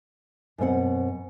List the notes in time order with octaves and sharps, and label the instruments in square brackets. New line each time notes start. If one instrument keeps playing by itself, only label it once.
[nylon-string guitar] F#2 B2 C4 F#5